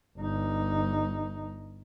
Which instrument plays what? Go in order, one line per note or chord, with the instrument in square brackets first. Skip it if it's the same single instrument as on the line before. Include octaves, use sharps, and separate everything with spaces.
[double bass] G1 D#4